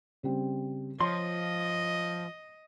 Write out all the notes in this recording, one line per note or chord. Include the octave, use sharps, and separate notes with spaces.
C#3 G3 C4
F3 C#5 D#5 C6